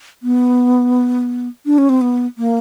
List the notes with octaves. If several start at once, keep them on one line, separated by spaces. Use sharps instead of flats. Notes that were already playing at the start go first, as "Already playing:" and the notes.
B3
D4
C#4
C4
B3
A#3